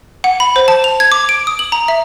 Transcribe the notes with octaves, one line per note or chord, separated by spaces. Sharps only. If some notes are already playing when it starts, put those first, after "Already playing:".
F#5
B5
C5
A5
F7
G#6
D6
D7
D#6
F#7
A#5
E5